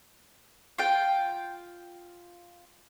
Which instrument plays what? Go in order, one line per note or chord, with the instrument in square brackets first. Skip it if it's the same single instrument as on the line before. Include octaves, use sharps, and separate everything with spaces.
[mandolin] F4 G5